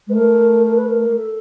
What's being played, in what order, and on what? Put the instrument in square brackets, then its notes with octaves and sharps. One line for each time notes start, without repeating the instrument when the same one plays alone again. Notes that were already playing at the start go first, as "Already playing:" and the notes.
[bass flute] G#3
[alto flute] B4
[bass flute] A3 [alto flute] A#4
[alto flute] A#4
B4
A#4
A4